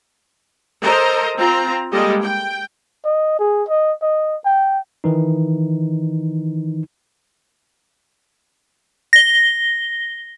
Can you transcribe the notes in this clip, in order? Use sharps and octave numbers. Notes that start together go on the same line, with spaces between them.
A4 A#4 C5 D#5 A#5
C4 F4 A#5
G3 G#3 A#3 G4 A4 D#5
G5
D#5
G#4
D#5
D#5
G5
D#3 E3 D#4
A#6 G7